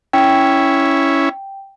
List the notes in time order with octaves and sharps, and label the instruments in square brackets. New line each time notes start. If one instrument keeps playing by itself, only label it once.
[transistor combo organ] C#4 E4 [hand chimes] G5